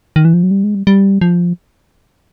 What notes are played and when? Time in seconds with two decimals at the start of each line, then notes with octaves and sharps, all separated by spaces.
0.16 D#3
0.25 E3
0.34 F3
0.43 F#3
0.51 G3
0.64 G#3
0.75 G3
0.87 G3
1.21 F3